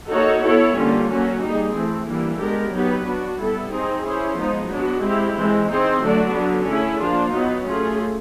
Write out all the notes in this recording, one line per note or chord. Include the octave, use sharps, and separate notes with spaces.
A#3 D#4 F#4 A4 C#5
B3 E4 A4 C#5
D3 G3 A#3 C#4 F4
F#3 A#3 C#4 F#4
G3 A#3 D#4 G#4
E3 A3 C4
E3 G3 A#3 D4
G#3 B3 D4 G4 A#4
F#3 B3 D#4 G4 B4
B3 D4 F#4
G3 B3 E4 A4
C4 D#4 G#4
C#4 E4 G#4 C5
F3 G#3 B3 D#4
F#3 B3 D4 F#4
G#3 C4 E4 G4
E3 G#3 C4
C4 D#4 G#4 C5
D3 F#3 A3 D4 F#4
D3 F#3 B3
A3 C#4 E4 G#4
F3 A#3 D4 F4
F#3 B3 D#4
A3 C#4 F4 G#4